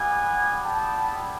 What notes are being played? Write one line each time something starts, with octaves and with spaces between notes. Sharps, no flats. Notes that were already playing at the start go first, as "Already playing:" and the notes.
Already playing: G3 B3 E4 G4 F#5 G#5
G5 A5